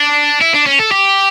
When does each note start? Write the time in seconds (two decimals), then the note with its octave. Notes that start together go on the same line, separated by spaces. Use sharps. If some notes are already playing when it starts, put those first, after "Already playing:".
Already playing: D4
0.42 E4
0.54 D4
0.67 C#4
0.79 A4
0.91 G4